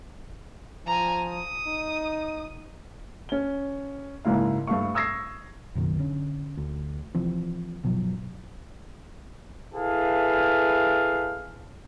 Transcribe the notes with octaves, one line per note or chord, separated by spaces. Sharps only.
F3 G#5 A#5
D#6
D#4
C#4 G7
F#1 G#2 E4 F5
G2 A3 A4 F5 C#6
C#6 D#6 E6 G#6 A#6 C7
F#1 B1 F#2 D#3
D3 C#4
D2
C3 E3 F3 C4
G1 B2 F3 F#3
E4 G#4 A4 B4 F5